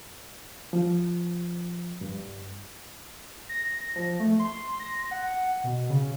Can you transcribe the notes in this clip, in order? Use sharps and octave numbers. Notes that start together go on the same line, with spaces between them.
F3
G2
A#6
F3
A3
C6
A#6
F#5
B2
C#3